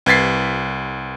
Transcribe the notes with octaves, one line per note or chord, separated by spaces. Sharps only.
C2 B4 G#6 A6 B6 C7